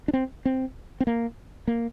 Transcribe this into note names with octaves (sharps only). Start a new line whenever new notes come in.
D4
C4
C4
C4
A#3
A#3